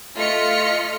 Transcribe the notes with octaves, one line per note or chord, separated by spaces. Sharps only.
A3 F4 D#5 F6 B6 C#7